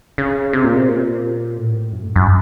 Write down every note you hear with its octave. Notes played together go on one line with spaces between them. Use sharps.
C#3
C3
A#2
C3
A#2
A2
F#2
A2
F#2